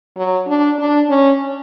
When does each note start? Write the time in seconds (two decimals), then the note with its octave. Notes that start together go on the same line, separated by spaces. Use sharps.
0.17 F#3
0.48 D4
0.79 D4
1.09 C#4